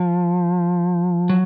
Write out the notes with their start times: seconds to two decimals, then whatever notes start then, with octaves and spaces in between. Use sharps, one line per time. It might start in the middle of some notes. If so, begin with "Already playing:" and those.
Already playing: F3
1.30 F#3